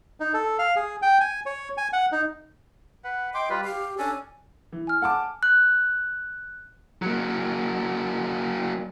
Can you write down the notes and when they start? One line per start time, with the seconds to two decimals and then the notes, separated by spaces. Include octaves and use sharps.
0.20 D#4
0.34 A4
0.59 F5
0.76 G#4
1.02 G5
1.20 G#5
1.46 C#5
1.78 G#5
1.93 F#5
2.12 D#4
3.04 B4 F#5
3.34 D#5 G5 C6 D6
3.50 G3 F4 B4
3.65 G4 F5
3.98 C#4 D4 A4 G#5
4.72 E3
4.87 G#5 F6
5.02 F#5 A5 D6
5.43 F#6
7.02 F#3 A#3